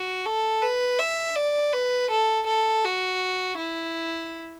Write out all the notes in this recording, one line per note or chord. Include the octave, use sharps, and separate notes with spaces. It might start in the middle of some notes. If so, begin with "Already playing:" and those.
Already playing: F#4
A4
B4
E5
D5
B4
A4
A4
F#4
E4